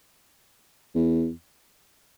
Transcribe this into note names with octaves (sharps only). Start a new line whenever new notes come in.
E2